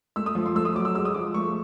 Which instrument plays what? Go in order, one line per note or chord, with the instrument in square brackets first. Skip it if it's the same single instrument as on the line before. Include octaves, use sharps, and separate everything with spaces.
[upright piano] A3 E6
D#6
F3
C6
A3 E6
D#6
F#3 D6
E6
G#3 E6
D#6
F3 D6
A3 C#6